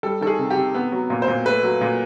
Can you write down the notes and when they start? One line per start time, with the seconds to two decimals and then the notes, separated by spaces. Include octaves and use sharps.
0.03 G3 A4
0.21 D#3 A4
0.27 G#4
0.39 C3
0.50 G4
0.56 C3
0.74 B3
0.92 F#3
1.10 A#2
1.22 C5
1.28 A#2
1.45 A3 B4
1.63 F#3
1.81 A#2